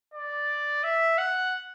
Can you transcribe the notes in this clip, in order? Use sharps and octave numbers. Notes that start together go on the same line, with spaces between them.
D5
E5
F#5